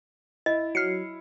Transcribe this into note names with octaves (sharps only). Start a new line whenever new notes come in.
E4 D#5
F#3 F6 C7 C#7